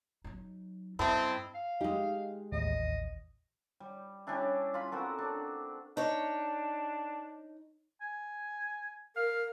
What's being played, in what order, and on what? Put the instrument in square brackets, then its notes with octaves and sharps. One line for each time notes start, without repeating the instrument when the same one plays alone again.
[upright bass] F#3 D#4
[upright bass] G2 C#4 [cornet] C4 [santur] E4 D#5 [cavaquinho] A4 D#6
[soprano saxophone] F5
[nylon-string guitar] G#3 G4 [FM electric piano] D#4
[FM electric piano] A1 D#2 [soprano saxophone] D#5
[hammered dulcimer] G3
G3 C#4 D4 E4
F4 B5
C4 F#4 A4 A#4
D4
[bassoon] D4 [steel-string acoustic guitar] D#4 C#5
[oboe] G#5
[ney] A#4 [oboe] F5